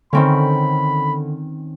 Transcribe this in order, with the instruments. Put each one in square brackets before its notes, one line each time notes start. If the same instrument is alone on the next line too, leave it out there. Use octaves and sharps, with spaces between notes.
[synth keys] D3 [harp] D#3 C4 C#4 [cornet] B5